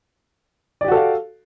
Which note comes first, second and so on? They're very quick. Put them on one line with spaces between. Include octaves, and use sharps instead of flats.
D5 G4 F#4 A4 F5